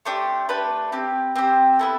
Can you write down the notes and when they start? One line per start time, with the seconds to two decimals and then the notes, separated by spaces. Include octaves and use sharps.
0.05 A3 D4 G4 C5
0.49 A3 D4 G4 B4
0.92 C4 G4
1.36 C4 G4 C5
1.79 B3 E4 A4